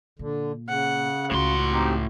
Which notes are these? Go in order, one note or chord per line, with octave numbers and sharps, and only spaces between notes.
A#2 D3
C#3 F#5
C#2 A2 F#4 C6
C4 D#4 G4